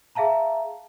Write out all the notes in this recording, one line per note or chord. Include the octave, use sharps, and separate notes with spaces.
G#4 E5 F5 A5 A#5